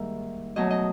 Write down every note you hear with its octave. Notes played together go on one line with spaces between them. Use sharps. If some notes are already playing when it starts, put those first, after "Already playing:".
Already playing: G#2 D#3 G3 A#3 E5
B2 F#3 A3 D#5
D#5